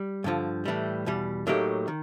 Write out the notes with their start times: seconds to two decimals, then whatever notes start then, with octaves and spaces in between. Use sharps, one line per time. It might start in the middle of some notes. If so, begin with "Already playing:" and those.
Already playing: G3
0.24 G2 D3 F3
0.65 A2 E3 G3
1.06 E2 B2 G3
1.47 A2 F#3 A#3 D#4 G4
1.88 D#3